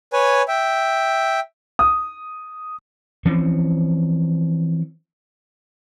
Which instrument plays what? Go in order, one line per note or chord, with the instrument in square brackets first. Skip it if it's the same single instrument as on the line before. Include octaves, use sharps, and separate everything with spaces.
[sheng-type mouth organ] B4 C#5 G#5
E5 G5
[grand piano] D#6
[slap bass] E3 F3 C4 C#4